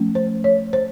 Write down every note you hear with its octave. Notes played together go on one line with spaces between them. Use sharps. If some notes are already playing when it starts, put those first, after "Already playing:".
Already playing: F3 A3 C#4
C5
C#5
C5